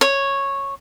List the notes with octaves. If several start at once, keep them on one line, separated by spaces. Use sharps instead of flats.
C#5